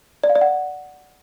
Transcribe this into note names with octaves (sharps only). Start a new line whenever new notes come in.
D5
F5
D5
F#5